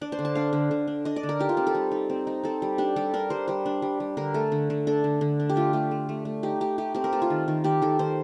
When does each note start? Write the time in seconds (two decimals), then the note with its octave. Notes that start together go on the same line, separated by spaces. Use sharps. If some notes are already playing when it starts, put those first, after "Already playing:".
0.01 D4 D5
0.12 C5
0.19 D3
0.25 A5
0.35 D4 F5
0.53 D3
0.71 D3
0.87 D4
1.05 D4 D#5
1.16 D5
1.23 D3
1.29 A#4
1.39 D#4 G4
1.49 F4
1.57 C4 G4
1.67 A4
1.75 G3
1.91 D#4
2.10 C4
2.27 D#4
2.44 C4 A4
2.62 G3
2.78 D4 G4
2.96 G3 A4
3.14 D4 A#4
3.30 G3 C5
3.48 G3 C5
3.66 D4
3.82 G3
4.00 G3
4.17 D3 A#4
4.34 A3 A4
4.52 D3
4.70 D3
4.87 D4 A4
5.04 D3
5.21 D3
5.40 D4
5.50 G4
5.56 A3 F4
5.73 A3 G4
5.91 A3
6.09 A3
6.25 A3
6.43 D#4 G4
6.61 D#4 G4
6.78 A3 G4
6.95 C4 G4
7.04 A#4
7.12 A3 A4
7.22 F4
7.30 D#3
7.48 D#3
7.64 D#3 G4
7.82 D#3 A4
7.99 D#3 C5